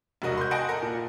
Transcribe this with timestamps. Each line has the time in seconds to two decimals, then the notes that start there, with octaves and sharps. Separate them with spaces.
0.22 E1 C2 F#4 A#4 D#5
0.37 C6 G6
0.51 D#5 F#5 G#5 A5 A#6 D7
0.69 A4 A#4
0.82 A#2